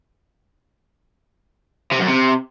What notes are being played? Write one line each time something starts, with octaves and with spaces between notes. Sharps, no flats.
C3
F#2
C3